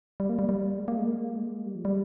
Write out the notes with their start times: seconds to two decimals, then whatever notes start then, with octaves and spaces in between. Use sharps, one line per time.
0.20 G3
0.29 A#3
0.39 G3
0.49 G3
0.78 G#3
0.88 A#3
0.98 G#3
1.08 A#3
1.36 G#3
1.66 G3
1.75 F3
1.85 G3